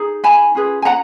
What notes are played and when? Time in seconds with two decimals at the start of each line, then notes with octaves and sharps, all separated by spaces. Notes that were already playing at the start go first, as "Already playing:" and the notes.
Already playing: D#4 G#4
0.24 G#5 B5
0.55 C#4 F4 G#4 B4
0.82 G#5
0.85 F#5 A#5